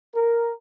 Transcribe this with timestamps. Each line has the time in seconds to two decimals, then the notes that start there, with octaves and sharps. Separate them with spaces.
0.15 A#4